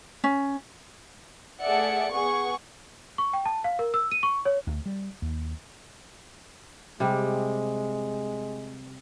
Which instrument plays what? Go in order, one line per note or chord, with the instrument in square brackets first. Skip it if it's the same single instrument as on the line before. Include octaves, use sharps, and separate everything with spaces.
[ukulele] C#4
[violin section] A3 G#4 D5 E5 F#5 C#7
B3 G#4 F#5 C#6
[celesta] C#6
G5
A5
F5
A#4
E6
D#7
C#6
C#5
[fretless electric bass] D2
G3
D#2
[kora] C3 G3 [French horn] G#3